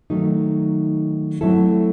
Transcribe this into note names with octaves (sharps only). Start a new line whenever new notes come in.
D#3 F#3 A3 D#4
F#3 A3 C4 E4 A4